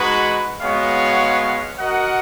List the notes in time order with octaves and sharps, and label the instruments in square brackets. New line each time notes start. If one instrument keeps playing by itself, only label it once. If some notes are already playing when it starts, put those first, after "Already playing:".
Already playing: [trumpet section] G#3 D#4 F#4 B4
G#3 B3 F#4 C#5 F5
F#4 A#4 D#5 F#5